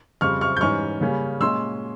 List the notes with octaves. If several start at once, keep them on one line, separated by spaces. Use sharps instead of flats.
F2 C#3 G3 C4 C#6 F6
C#6 F6
G6
G#2 E3 G3 C#4 C#6 F6
C#3 G3 A#3 C#4
A#2 G#3 C#4 C6 E6